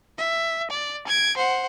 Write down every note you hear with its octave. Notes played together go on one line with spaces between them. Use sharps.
E5
D5
G#6 D7
C5 F#5